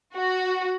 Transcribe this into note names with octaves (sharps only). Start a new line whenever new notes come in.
F#4